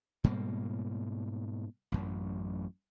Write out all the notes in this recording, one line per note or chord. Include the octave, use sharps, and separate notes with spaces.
G#2 B2 G3 A#3
A1 F#2